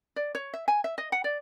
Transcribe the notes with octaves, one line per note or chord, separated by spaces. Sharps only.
D5
C#5
E5
G#5
E5
D#5
F#5
D5